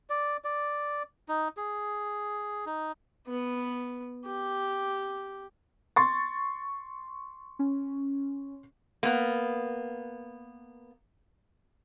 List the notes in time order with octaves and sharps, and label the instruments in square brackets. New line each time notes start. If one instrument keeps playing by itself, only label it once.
[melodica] D5
D5
D#4
G#4
D#4
[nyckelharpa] B3 B4
G4
[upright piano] C6 C#6 A6
[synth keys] C#4
[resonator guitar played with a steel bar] A#3 B3